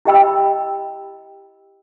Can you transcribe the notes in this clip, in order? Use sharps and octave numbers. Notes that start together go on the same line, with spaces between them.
E4 G4 D#5 G5 B5 E6